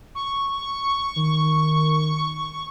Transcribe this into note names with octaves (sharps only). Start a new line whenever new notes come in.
C#6
D#3